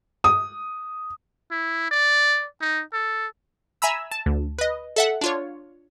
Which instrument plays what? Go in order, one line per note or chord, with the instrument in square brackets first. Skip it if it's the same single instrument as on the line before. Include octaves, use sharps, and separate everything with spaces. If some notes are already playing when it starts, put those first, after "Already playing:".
[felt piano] D#6
[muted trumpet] E4
D5
D#4
A4
[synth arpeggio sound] E5 G#5 A#5 B5 E6
A5
D2
B4 D#5
A4 E5 F#5
D4 F4 C#5